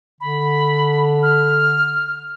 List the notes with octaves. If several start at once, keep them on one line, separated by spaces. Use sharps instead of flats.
D3 B5
F6